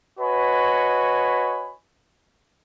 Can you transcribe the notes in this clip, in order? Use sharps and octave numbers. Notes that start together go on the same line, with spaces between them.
F#4 B4 C#5 D#5 G#5 B5